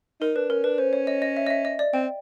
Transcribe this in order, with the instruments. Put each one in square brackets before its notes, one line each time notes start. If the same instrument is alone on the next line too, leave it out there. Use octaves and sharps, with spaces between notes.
[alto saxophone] D#4 [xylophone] A#4
[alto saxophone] D4 [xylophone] B4
[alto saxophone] C#4 [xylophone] A#4
[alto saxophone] D4 [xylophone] B4
[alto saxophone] C#4 [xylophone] C5
[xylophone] C#5
D#5
D#5
E5
D#5
E5
D#5
D5
[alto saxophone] C4 [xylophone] G5